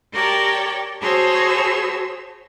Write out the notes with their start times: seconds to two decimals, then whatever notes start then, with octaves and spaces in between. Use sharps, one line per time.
0.12 G4 A#4 C#5 D5 G5 A5
1.00 F#4 G#4 C5 C#5 A5 E6